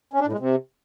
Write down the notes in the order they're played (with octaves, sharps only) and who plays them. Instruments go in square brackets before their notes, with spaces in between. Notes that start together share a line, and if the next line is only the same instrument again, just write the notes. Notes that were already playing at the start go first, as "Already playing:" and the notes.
[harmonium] C#4
D4
A2
G#3
C3